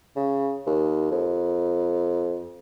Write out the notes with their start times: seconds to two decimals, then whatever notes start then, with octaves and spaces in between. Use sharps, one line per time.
0.16 C#3
0.67 D#2
1.11 F2